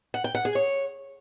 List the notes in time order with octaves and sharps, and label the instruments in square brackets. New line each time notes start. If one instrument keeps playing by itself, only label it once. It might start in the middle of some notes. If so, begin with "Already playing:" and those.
[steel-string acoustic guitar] F#5
G5
F#5
G#4
C#5